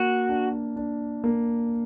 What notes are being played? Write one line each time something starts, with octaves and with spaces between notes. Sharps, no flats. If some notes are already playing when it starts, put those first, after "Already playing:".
Already playing: A#3 F#4
D4
D4
A#3